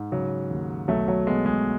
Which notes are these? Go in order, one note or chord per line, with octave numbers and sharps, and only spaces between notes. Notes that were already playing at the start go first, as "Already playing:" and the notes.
Already playing: G#2
C#3 F#3
D#2
B1 F#3 A3
F#3
B2 G#3
G#3